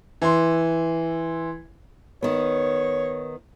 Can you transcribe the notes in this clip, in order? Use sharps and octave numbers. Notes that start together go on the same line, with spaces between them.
E3 C6
D#3 B3 C#5